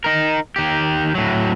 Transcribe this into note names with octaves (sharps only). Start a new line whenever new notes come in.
D#4 A#4
D#3 G4
A2 F#3